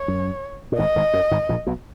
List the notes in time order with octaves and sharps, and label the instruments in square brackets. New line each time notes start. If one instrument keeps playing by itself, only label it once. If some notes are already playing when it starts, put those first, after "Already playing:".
Already playing: [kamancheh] C#5
[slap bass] F#2
A#2
[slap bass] G#1 G#2 [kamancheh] D#5
[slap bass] G#1 G#2
F#2
G#1 G#2
A#1 A#2
B1 B2